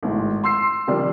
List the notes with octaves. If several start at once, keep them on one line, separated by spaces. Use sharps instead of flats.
G#1 A2 G#3
C6 E6 C7
C3 D#3 F3 G3 D4